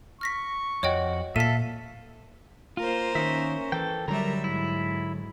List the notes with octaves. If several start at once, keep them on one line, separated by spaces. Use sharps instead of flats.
C#6 F6 A#6 B6
F2 F#4 C#5 D#5 G5
A#2 A4 E5 F5 B6 D#7
A#3 F4 A#4 C5
D#3 C#4 E5
E3 A4 G5
D3 F#3 G3 A#4 E5 A#5
G#2 E4